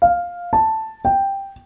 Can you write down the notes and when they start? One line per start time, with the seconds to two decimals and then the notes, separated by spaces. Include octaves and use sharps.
0.02 F5
0.53 A5
1.05 G5